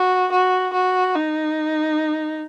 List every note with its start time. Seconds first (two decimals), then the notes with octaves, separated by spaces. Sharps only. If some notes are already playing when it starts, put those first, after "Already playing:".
Already playing: F#4
0.32 F#4
0.73 F#4
1.15 D#4